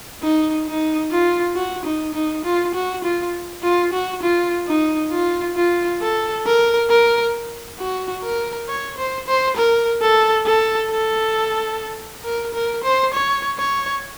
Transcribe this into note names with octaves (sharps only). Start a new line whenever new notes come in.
D#4
D#4
F4
F#4
D#4
D#4
F4
F#4
F4
F4
F#4
F4
D#4
F4
F4
A4
A#4
A#4
F#4
A#4
C#5
C5
C5
A#4
A4
A4
A4
A#4
A#4
C5
C#5
C#5